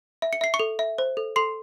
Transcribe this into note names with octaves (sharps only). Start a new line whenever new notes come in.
E5
C#7
E5 C7
C#6 C#7
A4
E5
C5
A4
A4 C6 C7